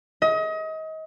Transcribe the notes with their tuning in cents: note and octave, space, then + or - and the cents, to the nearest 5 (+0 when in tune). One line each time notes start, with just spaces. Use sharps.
D#5 +30